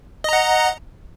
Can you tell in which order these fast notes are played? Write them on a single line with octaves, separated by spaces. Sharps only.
D#5 A#5 F#5